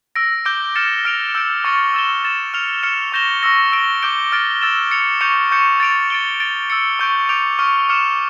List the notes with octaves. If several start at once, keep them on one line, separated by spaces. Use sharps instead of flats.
E6 A#6 D7
D6 G6 D7 G7
F6 A6 C#7 E7
F6 A#6 D7 F7
E6 G6 D7
C#6 F6 A6 C#7
E6 A6 E7 G7
A6 E7 G7
F6 C#7 F7
F6 C#7 E7
C#6 G6 A#6 E7 G7
C#6 E6 A#6
E6 A#6 D7 G7
D6 G6 D7 G7
F6 A6 D7
E6 A6 E7
A6 C#7 F7
C#6 G6 C#7 F7
C#6 G6 C#7 E7
A6 D7 F7
A6 D7 G7
A6 D7 G7
E6 A6 C#7
C#6 G6 D7
D6 G6 D7 F7
C#6 F6 C#7
D6 F6 C#7 E7